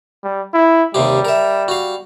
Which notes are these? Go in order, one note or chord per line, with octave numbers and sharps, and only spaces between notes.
G3
E4
D#2 C3 G3 G4
A#4 E5
F#4 F5